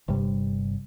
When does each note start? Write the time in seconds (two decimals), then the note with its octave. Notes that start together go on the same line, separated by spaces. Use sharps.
0.08 G1 G2 C3 G3